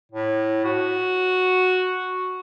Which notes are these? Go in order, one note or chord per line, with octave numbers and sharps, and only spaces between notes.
A2
F#4